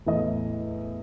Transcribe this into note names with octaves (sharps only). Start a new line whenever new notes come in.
E2 A2 D#5